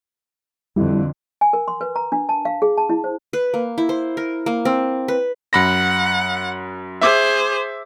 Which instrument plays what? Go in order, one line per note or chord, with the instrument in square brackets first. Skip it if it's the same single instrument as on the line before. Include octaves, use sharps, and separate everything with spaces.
[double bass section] F2 D3 [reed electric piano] G3 E4
[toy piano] G#5
A#4
C6
B4
A#5
D4
A5
F5
G#4
A5
E4
C5
[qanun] B4
A#3
E4
C5
A#4
A#3
C4
B4
[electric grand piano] F#2 B5 A#6 [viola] F#5
[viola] G#4 C5 [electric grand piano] E5 D6